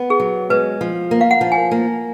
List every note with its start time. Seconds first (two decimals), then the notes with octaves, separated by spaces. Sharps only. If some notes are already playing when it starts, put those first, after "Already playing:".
Already playing: B3
0.10 G#4
0.20 F#3
0.50 G#3 B4
0.81 F3
1.11 A#3
1.21 F5
1.31 F#5
1.41 F3
1.52 G#5
1.71 A#3